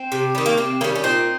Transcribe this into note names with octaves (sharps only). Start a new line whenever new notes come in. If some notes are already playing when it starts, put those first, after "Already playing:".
Already playing: C4
C3
D#3 G3
A#3
C3 C4
D#3 G3 A#3 C#4
C#4
A#2 C4 D#4